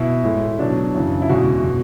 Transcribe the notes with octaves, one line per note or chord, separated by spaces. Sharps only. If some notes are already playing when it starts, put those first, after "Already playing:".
Already playing: B2 E4
A2 G#3
B2 F#3 D4
F#2 C#3 E3
E4
E2 B2 G#3 F#4
B2